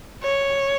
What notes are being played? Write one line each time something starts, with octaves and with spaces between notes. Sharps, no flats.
C#5